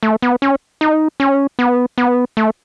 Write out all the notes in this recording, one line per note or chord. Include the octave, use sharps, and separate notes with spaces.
A3
B3
C#4
D#4
C#4
B3
B3
A3